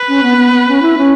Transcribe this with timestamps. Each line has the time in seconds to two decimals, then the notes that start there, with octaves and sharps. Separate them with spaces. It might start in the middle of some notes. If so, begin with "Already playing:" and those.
Already playing: B4
0.08 C#4
0.23 B3
0.37 B3
0.52 B3
0.68 C#4
0.82 E4
0.98 C#4